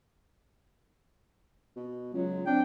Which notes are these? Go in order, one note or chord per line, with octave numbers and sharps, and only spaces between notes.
B2
C#2 F#3 F4
C4 D4 G5